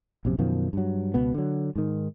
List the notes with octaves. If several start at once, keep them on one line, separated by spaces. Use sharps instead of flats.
A#1 F#2 C3
F#2 B2 D#3 F3
G2 F#3
C#2 B2 B3
D3 F#3
G#2 D#3